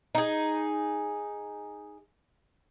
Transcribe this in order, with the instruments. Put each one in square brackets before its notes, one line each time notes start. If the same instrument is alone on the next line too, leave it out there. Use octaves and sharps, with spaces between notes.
[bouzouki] D#4 G#4